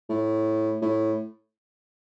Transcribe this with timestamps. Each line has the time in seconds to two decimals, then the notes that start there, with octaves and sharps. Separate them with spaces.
0.10 A2
0.82 A2